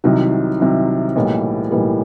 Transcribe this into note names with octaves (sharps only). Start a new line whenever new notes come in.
C2 C3 D#3 F#3
C2 C3 D#3 F#3
B1 A2 E3 G3 A#3
B1 A2 E3 G3 A#3